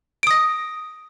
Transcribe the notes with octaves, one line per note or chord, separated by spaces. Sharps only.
D#6 A#6 D7